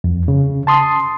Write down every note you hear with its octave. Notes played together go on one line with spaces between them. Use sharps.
F2
C#3
A5 C6 D#6